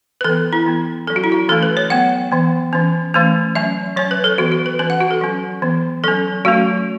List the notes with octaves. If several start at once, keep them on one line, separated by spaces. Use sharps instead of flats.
B4
E3 B3 A4
E4
E3 B3
F#3 C#4 A4
F#4
E4
F#4
E3 A3 C#4 A4
B4
C#5
F#3 B3 F#5
E3 B3
E3 C#4
E3 A3 C#4
F#3 C#4 E5
F#3 C#4 C#5
B4
A4
E3 B3 F#4
F#4
B4
E3 C#4 B4
F#5
F#4
A4
F#3 C#4
E3 B3
F#3 C#4 A4
F#3 A3 C#4 F#4